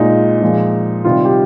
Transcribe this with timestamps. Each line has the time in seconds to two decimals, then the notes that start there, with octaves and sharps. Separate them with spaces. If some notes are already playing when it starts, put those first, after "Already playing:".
Already playing: A#2 G#3 D#4
0.41 A#2 F3 G#3
1.05 C3 D#3 G3 F4
1.25 G4